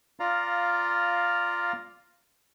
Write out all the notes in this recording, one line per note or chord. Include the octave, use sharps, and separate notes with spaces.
F4 D5 F5 A#5